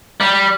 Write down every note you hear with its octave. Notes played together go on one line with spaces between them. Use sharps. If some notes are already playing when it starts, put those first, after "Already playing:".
G3